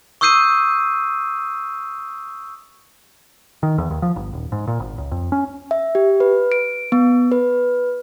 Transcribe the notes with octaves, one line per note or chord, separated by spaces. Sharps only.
C#6 D#6 E6 G6 C7 D#7
D#3
E2
D#2
F3
G1
D#1
G#2
A#2
G#1
C#2
F2
C#4
E5
G4
B4
D7
B3
B4